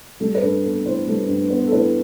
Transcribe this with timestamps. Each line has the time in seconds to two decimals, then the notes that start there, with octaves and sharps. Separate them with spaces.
0.20 G3 A4
0.35 B4
0.42 G2 A4
0.64 B3 A4
0.85 E3 C5
1.07 G3 A4
1.28 G2
1.50 B3
1.67 A4
1.72 E3 B4